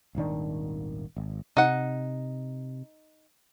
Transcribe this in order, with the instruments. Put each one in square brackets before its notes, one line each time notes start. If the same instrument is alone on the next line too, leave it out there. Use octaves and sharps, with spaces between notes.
[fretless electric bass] D#1 G#1 D#3 D4
G#1
[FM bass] C3 [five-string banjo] D#4 F#5